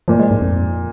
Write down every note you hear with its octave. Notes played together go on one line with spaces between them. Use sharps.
A#2 F3
G#3
G#2
F2